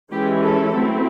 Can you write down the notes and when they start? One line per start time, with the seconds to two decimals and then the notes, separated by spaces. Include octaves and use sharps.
0.12 E3 G#3 C#4 E4 G4
0.43 A4
0.75 F#3 A3 C4 E4